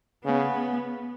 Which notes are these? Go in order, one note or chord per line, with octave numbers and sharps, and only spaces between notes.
C#3 B3